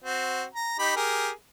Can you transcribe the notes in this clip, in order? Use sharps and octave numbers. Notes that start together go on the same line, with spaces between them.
C4 F#4
A#5
D#4 G4 B5
G4 G#4 A#4